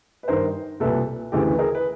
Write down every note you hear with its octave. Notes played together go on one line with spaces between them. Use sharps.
B4
G2 D#3 A#4 C5
C2 A#2 A4 B4
D2 C#3 E3 G4 A4
B4
G#4 A#4
B4